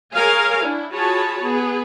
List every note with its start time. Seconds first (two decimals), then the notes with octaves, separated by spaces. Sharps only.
0.14 G#4 A#4 C#5 F5 G#5
0.62 D4 E4
0.94 F4 F#4 G#4 C#5 A5 B5
1.44 B3 G#4